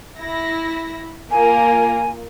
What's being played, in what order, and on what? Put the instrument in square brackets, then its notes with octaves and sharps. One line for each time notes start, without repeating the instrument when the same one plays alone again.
[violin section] E4 A#6
[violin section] A#3 F4 A#4 [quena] G#5